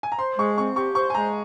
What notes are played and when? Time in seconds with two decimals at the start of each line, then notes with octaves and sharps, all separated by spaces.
0.03 G#5
0.12 A#5
0.19 C5 C6
0.38 G#3 C#6
0.58 C4 C#6
0.76 G4 C#6
0.95 C5 C#6
1.10 G#5
1.14 G#3 A#5